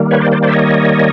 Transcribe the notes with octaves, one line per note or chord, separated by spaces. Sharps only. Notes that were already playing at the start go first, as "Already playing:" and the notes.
Already playing: D#3 G3 A#3
B4 C#5
C5 D5
C5 D5
C5 D5
E5
C#5 D#5